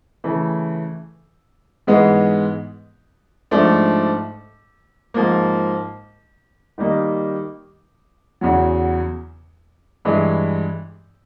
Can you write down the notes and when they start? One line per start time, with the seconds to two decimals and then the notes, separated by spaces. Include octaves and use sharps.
0.24 C#3 E3 A3
1.87 G#2 E3 G#3 B3
3.51 G#2 F3 A3 D4
5.14 G#2 F3 A#3
6.78 D#3 G3 A#3 D#4
8.41 E2 C#3 F#3
10.05 G2 E3 G#3